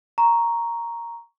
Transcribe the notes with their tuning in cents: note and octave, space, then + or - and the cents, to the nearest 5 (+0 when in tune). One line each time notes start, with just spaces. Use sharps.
A#5 +0 C#6 +0